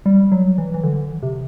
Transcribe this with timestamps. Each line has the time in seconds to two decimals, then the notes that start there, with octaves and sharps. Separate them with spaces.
0.06 G3
0.32 F#3
0.58 E3
0.74 E3
0.83 D3
1.23 C3